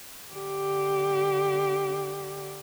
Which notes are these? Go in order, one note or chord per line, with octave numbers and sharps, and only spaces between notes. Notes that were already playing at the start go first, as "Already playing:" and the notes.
D3 G4